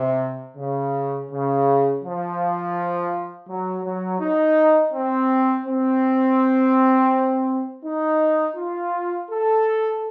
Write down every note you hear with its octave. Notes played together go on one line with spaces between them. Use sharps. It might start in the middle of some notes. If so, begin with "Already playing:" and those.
Already playing: C3
C#3
C#3
F3
F#3
F#3
D#4
C4
C4
D#4
F4
A4